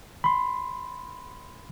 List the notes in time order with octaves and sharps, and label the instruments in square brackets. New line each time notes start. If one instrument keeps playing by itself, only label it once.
[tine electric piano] B5 C6